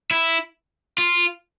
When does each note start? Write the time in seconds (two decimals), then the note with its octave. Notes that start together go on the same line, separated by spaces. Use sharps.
0.11 E4
0.98 F4